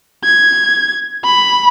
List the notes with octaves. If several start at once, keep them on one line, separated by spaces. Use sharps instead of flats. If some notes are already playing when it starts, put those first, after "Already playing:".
G#6
B5